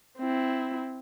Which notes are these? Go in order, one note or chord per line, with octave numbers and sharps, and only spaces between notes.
C4 E4